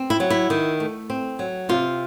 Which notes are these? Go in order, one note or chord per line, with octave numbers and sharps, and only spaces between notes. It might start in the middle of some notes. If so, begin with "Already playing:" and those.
Already playing: C4
E4
F#3
E4
D#3
A3
C4
F#3
C3 F4